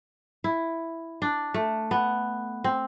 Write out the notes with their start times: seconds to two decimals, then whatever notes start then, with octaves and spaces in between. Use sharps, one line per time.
0.44 E4
1.22 D4
1.54 A3
1.91 B3
2.64 C4